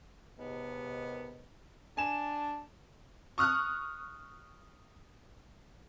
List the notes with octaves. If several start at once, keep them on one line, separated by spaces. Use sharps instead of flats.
D#2 G#2 C3 B3
D4 G#5 A5 E7
C#6 D#6 F6 F#6